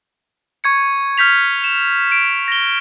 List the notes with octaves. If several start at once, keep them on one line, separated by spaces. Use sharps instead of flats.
C#6 G#6 C#7
F6 G6 B6 F7
E7
D7
A#6 G7